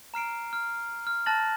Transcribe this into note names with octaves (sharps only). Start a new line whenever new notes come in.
A#5 F6 C7 D7
F6
F6
A5 F6 F#6 A6 A#6 F#7